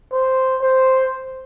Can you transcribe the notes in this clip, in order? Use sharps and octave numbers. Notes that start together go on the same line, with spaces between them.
C5
C5